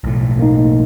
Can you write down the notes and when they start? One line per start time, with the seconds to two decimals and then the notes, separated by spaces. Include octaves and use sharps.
0.04 B1 A2
0.39 A#3 D#4